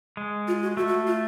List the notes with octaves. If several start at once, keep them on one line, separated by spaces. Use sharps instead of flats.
G#3
F4
F#4
A3 F#4
F#4
F4